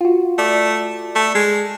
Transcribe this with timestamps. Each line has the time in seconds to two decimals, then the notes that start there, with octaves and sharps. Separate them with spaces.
0.01 F4 F#4
0.38 A3 D5
1.15 A3
1.34 G#3